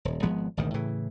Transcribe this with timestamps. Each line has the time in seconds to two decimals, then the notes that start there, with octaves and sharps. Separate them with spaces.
0.05 D#1
0.23 G#1 F3 G#3 B3
0.57 G#1 D2 B2 D#3
0.74 A2 C#3 E3